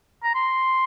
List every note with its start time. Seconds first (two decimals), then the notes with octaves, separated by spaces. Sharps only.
0.23 A#5
0.35 C6